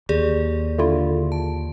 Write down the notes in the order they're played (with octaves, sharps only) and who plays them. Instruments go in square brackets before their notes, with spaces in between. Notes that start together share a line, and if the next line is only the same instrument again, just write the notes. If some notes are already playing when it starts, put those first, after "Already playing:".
[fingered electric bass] D#2 [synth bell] G4 G#4 D5
[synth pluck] D3 E4 F4
[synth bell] A5